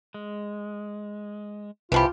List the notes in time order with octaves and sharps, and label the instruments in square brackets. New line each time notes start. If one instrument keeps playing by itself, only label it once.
[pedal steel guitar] G#3
[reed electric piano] C2 B5 [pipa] E3 F3 G4 [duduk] F4